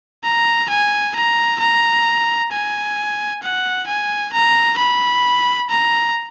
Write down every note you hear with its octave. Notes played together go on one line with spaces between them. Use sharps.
A#5
G#5
A#5
A#5
G#5
F#5
G#5
A#5
B5
A#5